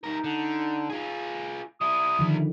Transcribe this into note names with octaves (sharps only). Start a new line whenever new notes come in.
G3 D#4 A#4
D3
F4 G#4
G3 E4 D#6
D3 D#3 F3